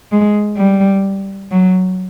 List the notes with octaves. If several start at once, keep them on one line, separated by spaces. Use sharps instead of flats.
G#3
G3
F#3